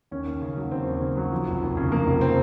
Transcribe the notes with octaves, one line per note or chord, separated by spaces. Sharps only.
D#2 C#4
D#2
C#3
F#3
D#2 C4
D#2
C#3
F#3
F3
F1
D#2
C#3
F3 A#3
F1
C4